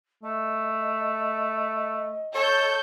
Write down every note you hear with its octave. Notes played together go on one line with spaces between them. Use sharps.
A3 D#5
A4 C#5 G6